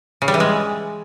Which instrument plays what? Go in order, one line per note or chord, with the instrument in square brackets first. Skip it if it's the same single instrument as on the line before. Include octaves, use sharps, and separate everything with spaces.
[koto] C#3
G3
E3
G#3